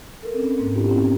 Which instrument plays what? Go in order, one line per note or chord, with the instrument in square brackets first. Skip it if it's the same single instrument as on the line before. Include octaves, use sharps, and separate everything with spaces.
[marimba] A4 A#4
C4 C#4
G#2 A#3
B3 D4 E4 F4 G4
C4 C#4 E4